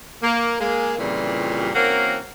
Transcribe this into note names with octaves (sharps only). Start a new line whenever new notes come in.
A#3
G#3 A#3
F2 A#2 C#3 E3 G3
E3 A#3 C4 C#4 F#4 A#4